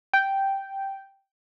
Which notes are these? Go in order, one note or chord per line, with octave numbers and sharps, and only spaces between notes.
G5